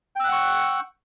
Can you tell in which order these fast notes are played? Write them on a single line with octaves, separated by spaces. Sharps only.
G5 E6 F#6 F#5 C#6